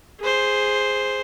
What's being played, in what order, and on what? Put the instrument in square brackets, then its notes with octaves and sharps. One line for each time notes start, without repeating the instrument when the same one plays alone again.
[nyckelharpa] G#4 C5